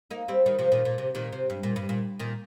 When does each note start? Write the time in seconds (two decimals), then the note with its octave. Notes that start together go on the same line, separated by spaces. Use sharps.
0.11 A#3 D#4
0.28 G3 C4
0.46 D#3 G3
0.59 C3 F3
0.72 A#2 D#3
0.85 A#2
0.98 C3
1.15 A#2 D#3
1.33 C3
1.50 G2
1.63 A#2
1.76 G2
1.89 A#2
2.19 A#2 D#3